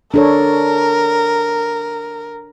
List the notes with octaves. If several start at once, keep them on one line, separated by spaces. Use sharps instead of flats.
D4 A4 A#4 C#5